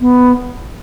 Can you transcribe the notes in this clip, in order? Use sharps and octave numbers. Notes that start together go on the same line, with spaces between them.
B3